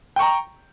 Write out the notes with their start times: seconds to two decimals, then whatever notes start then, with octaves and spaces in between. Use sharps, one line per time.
0.16 G5
0.19 C#6
0.22 A#5